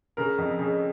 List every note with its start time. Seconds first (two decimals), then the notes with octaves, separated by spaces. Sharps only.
0.17 C#3 A#4
0.38 F2
0.59 C#3